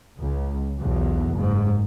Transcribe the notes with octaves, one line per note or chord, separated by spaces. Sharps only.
C#2
B1 E2
F#1 G#2